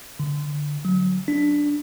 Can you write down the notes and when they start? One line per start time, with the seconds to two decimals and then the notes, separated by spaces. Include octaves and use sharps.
0.20 D3
0.85 F#3
1.28 D4